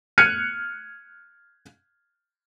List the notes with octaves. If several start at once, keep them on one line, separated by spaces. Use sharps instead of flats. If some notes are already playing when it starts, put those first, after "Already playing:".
F6 F#6 G#6 C#7 D#7